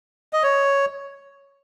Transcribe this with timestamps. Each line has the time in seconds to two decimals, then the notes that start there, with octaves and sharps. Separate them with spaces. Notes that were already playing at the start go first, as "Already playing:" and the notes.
0.33 D#5
0.43 C#5